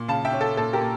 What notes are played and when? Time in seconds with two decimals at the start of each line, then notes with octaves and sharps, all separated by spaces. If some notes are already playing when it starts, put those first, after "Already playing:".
Already playing: A#2
0.08 C#3 F5 A5
0.25 E5 G5
0.33 C#4
0.41 A4
0.57 A#2 A4
0.73 G4 A#4
0.81 A#2